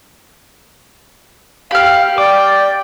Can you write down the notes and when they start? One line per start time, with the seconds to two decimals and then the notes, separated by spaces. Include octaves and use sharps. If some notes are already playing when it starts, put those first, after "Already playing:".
1.71 G4 F5 B5 F6
2.18 D5 G5 D6